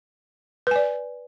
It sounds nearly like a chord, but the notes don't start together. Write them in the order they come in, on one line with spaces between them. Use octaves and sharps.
B4 G#5 D5